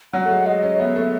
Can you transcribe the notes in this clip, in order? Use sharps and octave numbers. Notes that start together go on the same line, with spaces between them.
F#3 F#5
A3
G#3
G#3 D#5
C#4
B3 E5
A3
E5